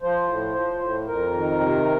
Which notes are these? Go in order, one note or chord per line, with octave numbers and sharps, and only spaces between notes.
F3 C5
A2
F3
A2
F2 A#4
D#3
C3